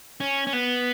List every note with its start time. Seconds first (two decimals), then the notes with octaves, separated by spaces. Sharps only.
0.21 C#4
0.47 C#4
0.53 B3